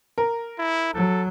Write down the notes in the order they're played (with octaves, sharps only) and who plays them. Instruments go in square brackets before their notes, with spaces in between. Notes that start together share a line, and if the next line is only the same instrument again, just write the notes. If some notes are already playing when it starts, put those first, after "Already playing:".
[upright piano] A#4
[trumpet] E4
[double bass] F#3 [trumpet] A4